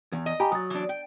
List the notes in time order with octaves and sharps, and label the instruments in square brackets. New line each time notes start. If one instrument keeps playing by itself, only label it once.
[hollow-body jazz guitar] E2
[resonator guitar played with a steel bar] D#5
[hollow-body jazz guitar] G4 [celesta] G#5 A#5 B5
[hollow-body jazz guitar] F#3 [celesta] D#6 A6
[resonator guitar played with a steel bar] E3 D4
G5